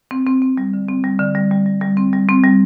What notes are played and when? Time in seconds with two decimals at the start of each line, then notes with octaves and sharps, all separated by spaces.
0.11 C4
0.27 C4
0.42 C4
0.57 G3
0.74 D3
0.89 C4
1.04 G3
1.19 D3
1.35 G3
1.51 G3
1.66 G3
1.81 G3
1.97 C4
2.13 G3
2.29 C4
2.44 G3